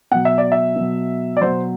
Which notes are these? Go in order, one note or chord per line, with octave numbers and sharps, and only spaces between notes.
B2 F#3 F#5
E5
D5
E5
B2 F#3
D5
B2 F#3 C5